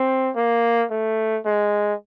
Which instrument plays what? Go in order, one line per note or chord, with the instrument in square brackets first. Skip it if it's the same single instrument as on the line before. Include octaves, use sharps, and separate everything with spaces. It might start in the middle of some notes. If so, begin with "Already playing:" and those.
Already playing: [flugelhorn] C4
A#3
A3
G#3